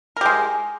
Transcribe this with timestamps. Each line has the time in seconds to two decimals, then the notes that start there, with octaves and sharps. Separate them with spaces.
0.17 A#4
0.21 G4
0.26 G#3